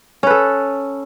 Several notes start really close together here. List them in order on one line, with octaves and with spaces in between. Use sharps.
C#4 B4 A4